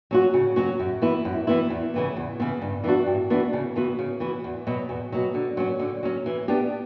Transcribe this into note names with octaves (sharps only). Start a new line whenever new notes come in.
F#3 C#4 F#4
C#3
F#3 C#4 F#4
F#2
E3 B3 E4
F#2
E3 B3 E4
E2
C#3 E3 B3
E2
C#3 E3 B3
G2
E3 B3 D4 F#4
G2
E3 B3 D4 F#4
C#3
E3 B3 F#4
C#3
E3 B3 F#4
E2
B2 F#3
E2
B2 F#3
D3
F#3 C#4
D3
F#3 C#4
E3
B3 D4 G4